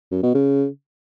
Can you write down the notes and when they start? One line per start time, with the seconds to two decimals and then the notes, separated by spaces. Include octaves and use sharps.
0.12 F#2
0.23 B2
0.34 C#3